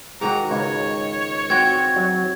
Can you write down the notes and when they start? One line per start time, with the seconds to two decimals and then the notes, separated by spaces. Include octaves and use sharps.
0.21 G#2 D#3 F#4 A#5
0.51 C#2 C#5
1.50 C4 F#4 G#6
1.96 F#3